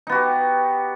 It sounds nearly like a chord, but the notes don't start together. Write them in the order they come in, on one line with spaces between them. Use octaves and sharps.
D#4 B3 F#4 G4